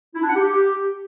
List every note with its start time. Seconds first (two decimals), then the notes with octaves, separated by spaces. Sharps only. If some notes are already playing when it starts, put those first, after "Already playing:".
0.15 E4
0.22 D4
0.28 F#5
0.35 G4